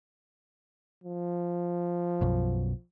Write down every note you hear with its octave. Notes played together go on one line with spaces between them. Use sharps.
F3
B1 F#2 B2